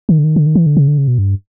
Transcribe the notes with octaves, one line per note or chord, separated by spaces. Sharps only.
D#3
D3
D#3
D3
D#3
E3
D3
C#3
D3
C#3
B2
G2